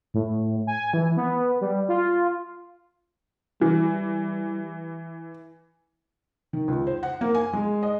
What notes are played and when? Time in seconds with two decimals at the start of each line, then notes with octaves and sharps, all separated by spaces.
0.14 A2
0.67 G#5
0.94 E3
1.17 B3
1.61 G3
1.89 F4
3.61 E3 G3
6.53 D#3
6.68 C#2
6.87 C5
7.03 F#5
7.21 A#3
7.35 G#5
7.53 G#3
7.83 D#5